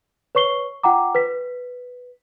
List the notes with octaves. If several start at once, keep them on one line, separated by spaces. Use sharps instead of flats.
B4 C#5 C#6 C7 G7
F4 F#5 G5 A#5 D6
B4 B6